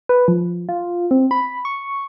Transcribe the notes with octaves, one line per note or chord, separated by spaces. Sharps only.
B4
F3
F4
C4
B5
C#6